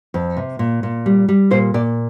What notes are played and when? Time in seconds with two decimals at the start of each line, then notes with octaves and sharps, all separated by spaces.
0.14 F2
0.37 C3
0.59 A#2
0.83 A#2
1.06 G3
1.29 G3
1.51 A#2 C5
1.74 A#2 D5